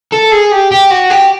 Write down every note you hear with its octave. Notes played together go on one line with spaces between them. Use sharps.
A4
G#4
G4
G4
F#4
G4